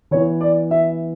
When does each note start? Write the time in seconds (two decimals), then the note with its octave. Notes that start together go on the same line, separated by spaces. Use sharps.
0.11 E3 B3 E4 C#5
0.41 D5
0.71 E5